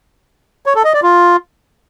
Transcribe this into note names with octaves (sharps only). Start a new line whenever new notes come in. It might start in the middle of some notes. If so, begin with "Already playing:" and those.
C#5
A4
D#5
D5
F4